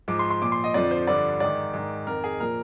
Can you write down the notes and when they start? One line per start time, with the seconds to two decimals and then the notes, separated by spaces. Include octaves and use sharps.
0.08 G#2 F3 D6
0.19 C6
0.30 C6
0.42 A#2 F3 D6
0.52 C6
0.64 D#5
0.74 F2 D3 F3 D5
0.91 C5
1.07 G2 D3 F3 D5
1.40 G#2 D#3 D5
1.74 G#2 D#3
2.07 F2 D#3 A#4
2.24 G#4
2.40 A#2 F3 A#4